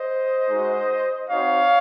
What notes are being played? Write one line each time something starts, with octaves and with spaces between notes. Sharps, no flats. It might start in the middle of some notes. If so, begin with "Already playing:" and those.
Already playing: C5 D#5
G#3 D#4 F#4
C4 D#4 F#4 C#5 F5